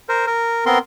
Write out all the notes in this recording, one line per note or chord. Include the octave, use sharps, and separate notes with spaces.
A#4 C5
A#4
B3 C4 A#4 C6